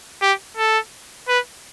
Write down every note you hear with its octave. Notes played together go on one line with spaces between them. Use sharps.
G4
A4
B4